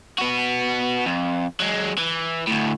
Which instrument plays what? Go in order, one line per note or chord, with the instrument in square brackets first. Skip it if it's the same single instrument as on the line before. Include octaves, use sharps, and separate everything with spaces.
[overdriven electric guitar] B3 F#4
F2
F#3 G#3
E3
D2 A2